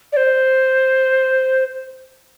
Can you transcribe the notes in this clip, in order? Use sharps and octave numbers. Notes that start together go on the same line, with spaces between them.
D5
C5